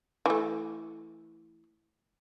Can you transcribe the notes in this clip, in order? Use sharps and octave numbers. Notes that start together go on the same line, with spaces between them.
E3 A3